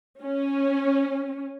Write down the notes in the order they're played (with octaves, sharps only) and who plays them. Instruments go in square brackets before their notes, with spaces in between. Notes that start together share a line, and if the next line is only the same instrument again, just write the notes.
[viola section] C#4